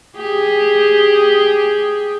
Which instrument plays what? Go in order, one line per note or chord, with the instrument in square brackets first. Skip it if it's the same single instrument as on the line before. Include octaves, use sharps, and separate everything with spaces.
[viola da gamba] G4 G#4